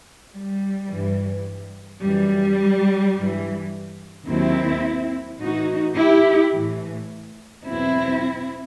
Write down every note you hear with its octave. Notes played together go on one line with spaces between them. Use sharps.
G3
G2 E3
F#2 E3 G3
G2 E3
D#2 D#3 F#3 C4 E4
A2 E3 D#4 F#4
E4 G4
A2 E3
E2 B2 F#3 C4 E4